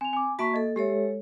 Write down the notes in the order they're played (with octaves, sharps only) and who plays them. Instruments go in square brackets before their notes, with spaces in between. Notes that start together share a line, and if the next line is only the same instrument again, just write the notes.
[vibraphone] C4 [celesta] G#5 F7
[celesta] G#5 D6
[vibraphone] A#3 E5 A5 [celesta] F#4 C#6 B6
[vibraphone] A#3 A4 [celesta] D#5
[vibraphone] G#3 A4 C#5 [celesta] G4 E5